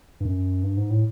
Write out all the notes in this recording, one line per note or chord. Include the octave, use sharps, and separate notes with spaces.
G2
F#2
G2
G#2
A2